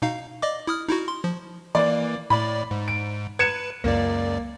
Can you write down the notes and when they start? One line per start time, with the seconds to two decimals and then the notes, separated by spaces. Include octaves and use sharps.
0.02 B2 D#4 F5
0.42 D5 D#5 D6
0.67 E4 D#6 F6
0.88 D#4 E4 F#4
1.08 C6
1.24 F3
1.75 E3 A#3 D5
2.30 A2 D5 B5
2.71 G#2
2.88 D7
3.39 B4 G#6 C#7 E7
3.84 C#2 F#2 A#3 D5